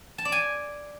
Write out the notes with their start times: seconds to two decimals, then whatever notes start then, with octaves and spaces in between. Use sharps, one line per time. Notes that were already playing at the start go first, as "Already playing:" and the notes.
0.18 A5
0.25 D5
0.32 G#5